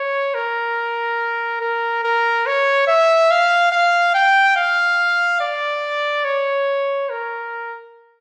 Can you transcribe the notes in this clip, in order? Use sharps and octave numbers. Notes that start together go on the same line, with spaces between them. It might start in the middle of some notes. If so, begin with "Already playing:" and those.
Already playing: C#5
A#4
A#4
A#4
C#5
E5
F5
F5
G5
F5
D5
C#5
A#4